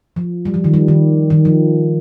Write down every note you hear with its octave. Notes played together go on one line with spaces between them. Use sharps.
F3
G3
F3
D#3
G3
D#3
D#3
F3